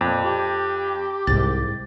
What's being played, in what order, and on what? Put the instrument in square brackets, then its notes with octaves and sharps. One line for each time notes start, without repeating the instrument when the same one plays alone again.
[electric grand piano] F2 [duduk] A#2
[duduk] G4
[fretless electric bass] C2 G#2 [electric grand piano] A6